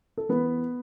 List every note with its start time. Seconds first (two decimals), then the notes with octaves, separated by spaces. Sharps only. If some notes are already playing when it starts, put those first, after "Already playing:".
0.17 A4
0.29 E3 B3 B4